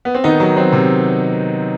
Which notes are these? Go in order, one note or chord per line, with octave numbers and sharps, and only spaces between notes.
B3
C4
D#3 B3 D#4
F#3
F#3 C4
C3